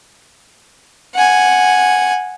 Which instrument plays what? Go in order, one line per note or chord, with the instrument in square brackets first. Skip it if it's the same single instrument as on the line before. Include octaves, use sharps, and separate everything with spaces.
[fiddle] F#5 G#5